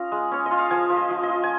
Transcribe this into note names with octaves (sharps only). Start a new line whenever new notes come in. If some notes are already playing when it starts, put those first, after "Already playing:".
Already playing: C#4 F4 D#5 F5
G#3
C#4 C#5
D#5
F4
F5
F3 G#5
F3
D#5
F3
D#5
F4
G#5